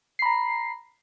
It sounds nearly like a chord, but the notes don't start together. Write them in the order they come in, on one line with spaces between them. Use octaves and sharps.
C7 B5 A#5